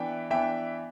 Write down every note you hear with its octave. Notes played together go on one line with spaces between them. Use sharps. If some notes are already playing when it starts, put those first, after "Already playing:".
Already playing: E3 B3 D4 E5 G5
E3 B3 D4 E5 G5